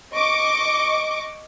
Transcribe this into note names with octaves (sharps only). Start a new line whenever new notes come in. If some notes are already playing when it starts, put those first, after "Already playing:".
D#5 C#6 D6